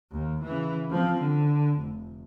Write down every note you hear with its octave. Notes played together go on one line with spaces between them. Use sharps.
D#2
C#3 E3
F3 C4
D3
F1